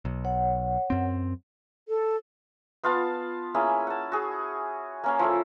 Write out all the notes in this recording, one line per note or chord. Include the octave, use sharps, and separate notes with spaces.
B1
C#5 F#5
F#2 C4
A4
B3 F4 F5 A5
A#3 C#4 E4 G#4
F#5 A5
F#4 G#4
A#3 C#4 F5
F3 E4 A4